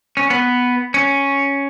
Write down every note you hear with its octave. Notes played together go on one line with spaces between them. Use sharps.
C#4
B3
C#4